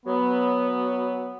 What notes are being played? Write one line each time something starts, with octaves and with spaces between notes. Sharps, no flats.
F#3 B3